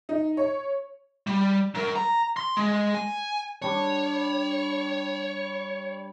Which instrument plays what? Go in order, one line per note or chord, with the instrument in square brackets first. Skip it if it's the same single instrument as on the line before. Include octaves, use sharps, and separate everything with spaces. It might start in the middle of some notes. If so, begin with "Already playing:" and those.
[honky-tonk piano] D#4
C#5
[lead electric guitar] G3
F#3 A#4
A#5
C6
G#3
G#5
[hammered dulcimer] G3 D4 [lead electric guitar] C#5